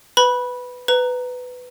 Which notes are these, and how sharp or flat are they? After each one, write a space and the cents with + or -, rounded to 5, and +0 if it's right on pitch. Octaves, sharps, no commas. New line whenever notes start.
B4 +10 B5 -15
B4 +15 A#5 +0